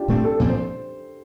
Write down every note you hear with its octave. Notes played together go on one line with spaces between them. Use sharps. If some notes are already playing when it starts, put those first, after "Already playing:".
Already playing: D4 F4 G4
A#2 A3 C4
A4
A#2 F3 C4 C5
C5